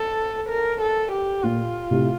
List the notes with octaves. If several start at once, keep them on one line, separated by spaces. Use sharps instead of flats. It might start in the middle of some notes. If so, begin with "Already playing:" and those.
Already playing: A4
A#4
A4
G4
A#2 F4
A2 C3